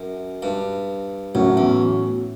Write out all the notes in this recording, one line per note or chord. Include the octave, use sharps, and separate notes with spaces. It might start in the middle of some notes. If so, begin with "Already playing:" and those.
Already playing: F#2
G2
F#2 A2 F#3 C#4
E2